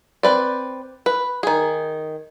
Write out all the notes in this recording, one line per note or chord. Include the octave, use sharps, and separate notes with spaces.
C4 B4 D5
B4
D#3 G#4